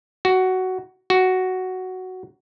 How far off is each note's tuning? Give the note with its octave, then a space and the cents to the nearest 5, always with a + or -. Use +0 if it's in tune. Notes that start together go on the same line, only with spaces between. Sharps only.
F#4 +10
F#4 +5